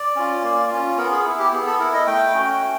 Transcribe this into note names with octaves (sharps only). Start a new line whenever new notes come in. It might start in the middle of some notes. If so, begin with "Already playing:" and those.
Already playing: D5
C#4 F4
A#3
C#4 F4
B3 A#4
G#4
E4
G4
B3 G#4
A4
E4 A#4
D#5
A3 G5
C#4 F#4
A3